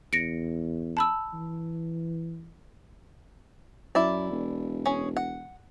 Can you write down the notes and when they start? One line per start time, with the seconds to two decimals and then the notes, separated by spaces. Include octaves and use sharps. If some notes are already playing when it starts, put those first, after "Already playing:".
0.13 E2 A#6 C#7 D7
0.97 A5 B5 E6
1.33 E3
3.95 F#2 E4 D5
4.31 E1
4.86 C#4 G#4
5.17 F#5